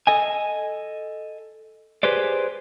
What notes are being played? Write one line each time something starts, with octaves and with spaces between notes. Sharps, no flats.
A4 D#5 G#5
G4 G#4 B4 C5 D5